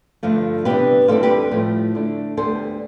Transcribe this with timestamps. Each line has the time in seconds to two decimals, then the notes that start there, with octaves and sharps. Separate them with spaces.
0.23 G2 D3 F3 A3
0.65 C3 E3 B3 D4 G4 B4
1.08 D2 D3 G3 C4 E4 F4 A4
1.23 G4 B4
1.51 A2 F3 A3
1.95 D3 A3 D4
2.37 D2 D3 G3 B3 A4 C5